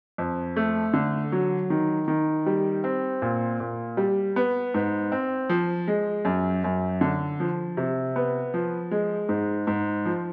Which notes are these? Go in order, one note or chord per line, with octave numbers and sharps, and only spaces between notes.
F2
A3
D3
F#3
D#3
D#3
G3
C4
A#2
A#2
G3
B3
G#2
C4
F3
G#3
F#2
F#2
D3
F3
C3
B3
F3
G#3
G#2
G#2
F3